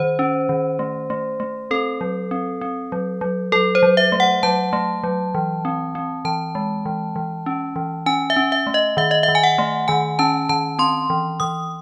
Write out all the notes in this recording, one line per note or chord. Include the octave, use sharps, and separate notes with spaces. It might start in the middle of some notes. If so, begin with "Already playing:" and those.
Already playing: D#3 C5
C#4
D#3
A3
A3
A3
C4 A4
F#3
C4
C4
F#3
F#3
F#3 A4
C5
F#3
E5
A3
F#5
F#3 A5
A3
F#3
E3
C4
C4
E3 A5
G#3
E3
E3
C#4
E3
C#4 G#5
E5
C#4
E5
A3
D#5
D#3 E5
D#5
E5
D#3
G#5
F#5
A3
D#3 G#5
C#4 A5
D#3 A5
C4 C6
E3
E3 D#6